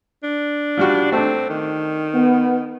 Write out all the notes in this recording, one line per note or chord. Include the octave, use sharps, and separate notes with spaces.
D4
F3 G3 F#4
A3 C4 D4
D#3
B3